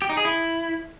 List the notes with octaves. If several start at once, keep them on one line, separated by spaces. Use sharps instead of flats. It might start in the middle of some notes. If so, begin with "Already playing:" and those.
G4
D#4
G#4
E4